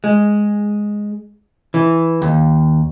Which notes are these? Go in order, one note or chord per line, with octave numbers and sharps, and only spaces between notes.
G#3
E3
D#2